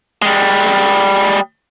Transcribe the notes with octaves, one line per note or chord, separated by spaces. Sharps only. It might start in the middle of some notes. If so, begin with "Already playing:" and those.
G3 G#3